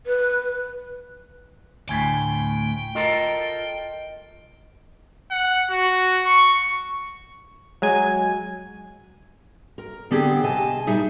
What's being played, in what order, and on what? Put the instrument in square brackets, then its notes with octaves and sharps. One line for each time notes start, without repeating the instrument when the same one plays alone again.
[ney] B4
[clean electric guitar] D2 A2 [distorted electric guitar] G5 [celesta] G#5 G#6 B6
[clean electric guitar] F4 A4 A#4 [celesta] D#5
[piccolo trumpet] F#5
F#4
C#6
[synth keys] F#3 G#3 G#5
[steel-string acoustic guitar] A#4
D3 B3 C4 G4 G#4
C3 D#5 G#5 A5
A#2 G3 D#4 G#4 E5